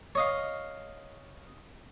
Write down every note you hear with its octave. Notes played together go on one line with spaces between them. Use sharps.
C#5 D#5 F5